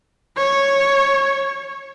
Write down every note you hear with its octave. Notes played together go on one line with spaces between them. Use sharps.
C#5